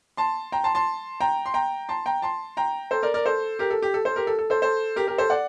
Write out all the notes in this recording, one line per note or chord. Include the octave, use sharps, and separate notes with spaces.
A5 C6
G5 A#5
A5 C6
A5 C6
G5 A#5
C6
G5 A#5
A5 C6
G5 A#5
A5 C6
G5 A#5
A4 C5
A#4 D5
A#4 D5
A4 C5
G4 A#4
A4
G4
A4
A4 C5
G4 A#4
A4
A4
A4 C5
A4 C5
G4 A#4
G4 A#4
A4 C5
D5 F#5